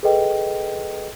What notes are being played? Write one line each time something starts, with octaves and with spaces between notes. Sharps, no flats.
G#4 A4 B4 D#5 G5